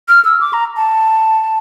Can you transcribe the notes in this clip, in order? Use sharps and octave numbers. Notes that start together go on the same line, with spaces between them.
F6
E6
D6
A#5
A5